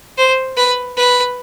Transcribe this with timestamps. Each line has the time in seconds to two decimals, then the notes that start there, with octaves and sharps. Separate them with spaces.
0.18 C5
0.57 B4
0.97 B4